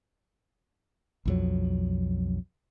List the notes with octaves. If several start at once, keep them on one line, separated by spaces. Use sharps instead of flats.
B1 F2 F#3